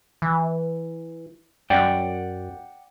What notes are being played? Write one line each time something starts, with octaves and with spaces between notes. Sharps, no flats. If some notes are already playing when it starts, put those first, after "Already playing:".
E3
F#2 D5 F#5 G5